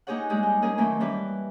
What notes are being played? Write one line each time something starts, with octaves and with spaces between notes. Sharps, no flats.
A#3 D#4 G4 G#4 C#5 F#5
G3 G#3 G4 G#4
D#4
A#3 C#4 G#4 A#4 D#5 G#5
D#3 E3 F#3 A3 A#3 C#4
E3 G3 A#3 C#4 B4